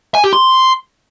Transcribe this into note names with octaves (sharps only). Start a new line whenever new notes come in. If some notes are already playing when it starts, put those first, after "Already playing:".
G#5
G4
C6